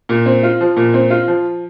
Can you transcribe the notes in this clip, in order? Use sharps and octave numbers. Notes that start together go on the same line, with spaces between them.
A#2
C4
F4
F3
A#2
C4
F4
F3